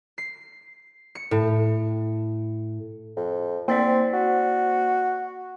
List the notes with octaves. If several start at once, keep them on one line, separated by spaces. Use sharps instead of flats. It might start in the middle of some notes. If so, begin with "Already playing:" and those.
C7
C#7
A2
F2
A#3 C4 C5 D5
F#4